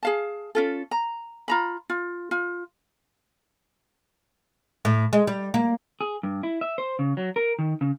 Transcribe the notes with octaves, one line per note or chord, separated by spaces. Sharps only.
G#4 F5 A5
C#4 F4 A4
A#5
F4 A#5 B5
F4
F4
A2
G#3
G3
A#3
G#4
G2
E4
E5
C5
C#3
F#3
A#4
D#3
C#3